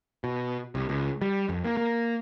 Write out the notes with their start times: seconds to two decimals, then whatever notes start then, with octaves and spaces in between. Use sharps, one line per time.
0.24 B2
0.75 C2
0.89 C#2
1.22 G3
1.49 F2
1.64 A#3
1.77 A#3